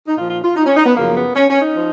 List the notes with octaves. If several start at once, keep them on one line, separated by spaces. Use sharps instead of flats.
D#4
A#2 F3 F4
F4
F4
D#4
C#4
D#4
B3
F#2 C#3 F3 A#3
B3
C#4
C#4
D#4
F3